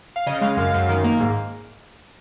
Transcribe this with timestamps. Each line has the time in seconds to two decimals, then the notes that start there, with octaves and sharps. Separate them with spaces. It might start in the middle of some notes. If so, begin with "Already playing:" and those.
0.16 F5
0.27 C#3 D#5
0.41 G#3 F5
0.57 F#2 F5
0.74 F#2
0.89 D#3
1.04 A#3
1.20 G#2